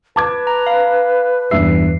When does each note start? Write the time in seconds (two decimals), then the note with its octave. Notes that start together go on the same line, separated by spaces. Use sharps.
0.16 B4 A5 D6 G#6
0.47 A#5
0.67 F5
1.51 E2 G2 E5 E6 C7